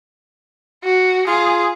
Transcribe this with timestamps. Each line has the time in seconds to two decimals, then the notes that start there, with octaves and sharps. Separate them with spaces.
0.84 F#4
1.27 F4 G#4